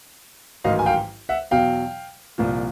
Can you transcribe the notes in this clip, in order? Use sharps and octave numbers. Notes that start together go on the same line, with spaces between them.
A1 G#2 D#3 F#3 D#5 F5
G#5
F5 G5
E5 F#5
E2 B2 F#3 F5 G5
C2 A#2 F3